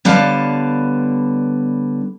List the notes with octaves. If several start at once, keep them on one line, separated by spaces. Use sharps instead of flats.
D3 G3 B3 C#5 F5 A5